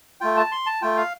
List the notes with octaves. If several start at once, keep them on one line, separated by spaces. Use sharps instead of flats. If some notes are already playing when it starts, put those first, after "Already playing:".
A3 F4 G5
A5
C6
A5
A3 F4 G5
F5